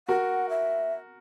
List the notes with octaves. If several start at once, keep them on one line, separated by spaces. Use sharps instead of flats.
F#4 A#4 F#5
E5